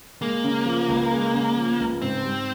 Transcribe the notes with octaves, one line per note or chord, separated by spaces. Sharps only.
G#3 A#3
C#3
F3
C#2
G#3
C#3
F3
C#2
G#2 C4
G3